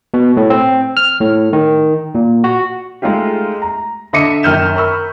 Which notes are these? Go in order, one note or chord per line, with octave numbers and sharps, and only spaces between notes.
B2
A2
C4
F6
A2
D#3
A#2
F#4
G#3 A3 D#4 F4 G4
A#5
D3 D#5 E5 D6 C#7 D#7
F#2 D#3 F6 G6 E7
A#4 B5 C#6 E6